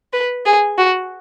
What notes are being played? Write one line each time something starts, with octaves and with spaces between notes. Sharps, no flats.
B4
G#4
F#4